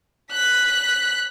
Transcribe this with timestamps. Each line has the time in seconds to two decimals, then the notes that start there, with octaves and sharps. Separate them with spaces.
0.31 F#6 B6